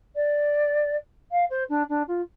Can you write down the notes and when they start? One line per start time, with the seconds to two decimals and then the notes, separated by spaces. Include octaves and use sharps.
0.15 D5
1.31 F5
1.50 C5
1.69 D4
1.89 D4
2.07 F4